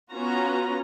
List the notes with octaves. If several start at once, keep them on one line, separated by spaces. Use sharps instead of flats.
B3 C#4 F4 F#4 A#5